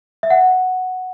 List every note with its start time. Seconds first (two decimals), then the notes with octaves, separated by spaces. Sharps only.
0.23 E5
0.30 F#5